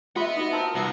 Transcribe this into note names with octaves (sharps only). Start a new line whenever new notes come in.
F4 B4 D#5 E5 F#5 B5
D#4 F#4 D#5
C4 A#4 A5
C2 B3 A#5